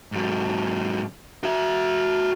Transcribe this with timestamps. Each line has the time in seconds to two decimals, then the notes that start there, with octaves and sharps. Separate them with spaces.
0.12 G#2 F#3
1.43 F#4 E5